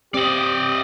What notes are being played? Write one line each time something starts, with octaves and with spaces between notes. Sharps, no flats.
C4 G4 D5 D#5